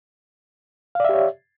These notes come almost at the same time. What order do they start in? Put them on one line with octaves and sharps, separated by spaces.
F5 D5 E5 G4 C#5